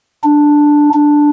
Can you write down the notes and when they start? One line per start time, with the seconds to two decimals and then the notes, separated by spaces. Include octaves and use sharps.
0.23 D4
0.94 D4